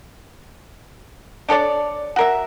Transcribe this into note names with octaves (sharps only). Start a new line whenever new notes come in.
D4 A4 C#5 D5
F#4 A#4 E5